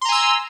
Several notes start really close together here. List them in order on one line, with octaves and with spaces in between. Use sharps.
C6 A#5 G#5 E6